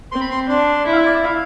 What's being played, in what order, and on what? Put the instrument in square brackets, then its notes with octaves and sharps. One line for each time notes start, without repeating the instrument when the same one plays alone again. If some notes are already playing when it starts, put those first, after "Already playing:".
[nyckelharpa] C4 [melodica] C6
[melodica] B5
C6
[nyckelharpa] D4 [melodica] C6
[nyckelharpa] E4
[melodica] F5
E5
D5
E5
F5